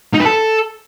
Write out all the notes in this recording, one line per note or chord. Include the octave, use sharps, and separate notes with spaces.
D#4
B4
A4